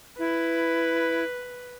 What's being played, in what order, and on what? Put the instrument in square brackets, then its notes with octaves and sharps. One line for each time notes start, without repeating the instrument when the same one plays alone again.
[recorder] E4 [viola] B4